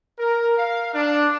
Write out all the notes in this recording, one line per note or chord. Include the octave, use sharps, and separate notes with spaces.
A#4
F5
D4